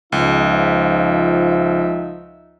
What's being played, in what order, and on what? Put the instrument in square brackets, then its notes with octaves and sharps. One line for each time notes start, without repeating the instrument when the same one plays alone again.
[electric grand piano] C#2 [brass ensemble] F3 D#4 E5